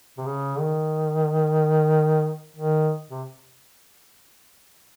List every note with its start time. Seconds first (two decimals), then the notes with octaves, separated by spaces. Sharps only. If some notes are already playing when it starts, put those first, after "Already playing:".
0.18 C3
0.26 C#3
0.59 D#3
2.56 D#3
3.10 C3